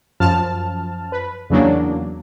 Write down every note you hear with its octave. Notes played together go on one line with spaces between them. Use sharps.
F#2 F3 A5 F6
B4
E2 C#3 F#3 A#3 D4